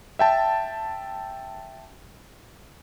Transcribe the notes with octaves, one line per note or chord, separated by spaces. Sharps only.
E5 G5 A5